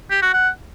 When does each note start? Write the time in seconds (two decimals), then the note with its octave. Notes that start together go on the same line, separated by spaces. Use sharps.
0.11 G4
0.22 F#4
0.33 F#5